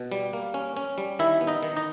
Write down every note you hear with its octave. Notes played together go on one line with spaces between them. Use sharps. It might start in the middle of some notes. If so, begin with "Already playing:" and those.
Already playing: B2
G3
A#3
C#4
C#4
G3
D#3 E4 E5
B3
D#4 D#5
D#3
D#4 D#5